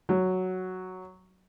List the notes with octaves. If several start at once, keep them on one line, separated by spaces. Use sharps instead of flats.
F#3